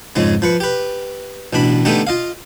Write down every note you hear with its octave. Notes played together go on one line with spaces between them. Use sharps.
F2 G#2 C#3 G#3
F3 B4 C#6
G4 B4
A1 B2 D4 B5
D3 A3 B3 D4 D#4 G4
F4 D#5 F5